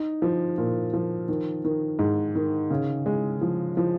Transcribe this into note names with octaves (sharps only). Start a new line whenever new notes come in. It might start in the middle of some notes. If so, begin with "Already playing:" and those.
Already playing: D#4
F3
A#2
F3
D#3
D#3
G#2
D#3
C#3
G#3
F3
F3